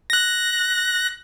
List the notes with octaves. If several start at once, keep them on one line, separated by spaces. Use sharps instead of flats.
F#6 A#6